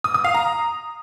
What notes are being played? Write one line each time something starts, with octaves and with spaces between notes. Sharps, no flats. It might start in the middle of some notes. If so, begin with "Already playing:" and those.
D#6
D#6
F5
A#5